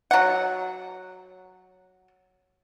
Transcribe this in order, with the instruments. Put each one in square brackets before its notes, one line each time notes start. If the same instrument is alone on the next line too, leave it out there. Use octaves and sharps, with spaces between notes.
[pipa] F#3 F#5